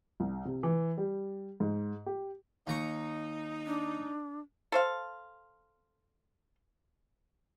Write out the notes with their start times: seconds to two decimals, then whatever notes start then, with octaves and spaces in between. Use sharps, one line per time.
0.20 C2
0.45 C3
0.63 E3
0.98 G3
1.60 G#2
2.06 G4
2.67 D#2 D#4 A#5 C#6
3.66 D4
4.72 A4 C5 F5